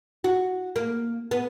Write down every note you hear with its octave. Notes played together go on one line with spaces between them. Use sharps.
F#4
A#3
B3